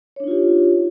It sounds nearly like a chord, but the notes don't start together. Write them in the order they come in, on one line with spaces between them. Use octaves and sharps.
C#5 D4 D#4 F4 G4